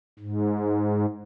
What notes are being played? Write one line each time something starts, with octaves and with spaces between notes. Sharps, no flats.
G#2